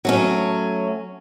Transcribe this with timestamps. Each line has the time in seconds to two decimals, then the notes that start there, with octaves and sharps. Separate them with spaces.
0.05 F#3 A3 C#4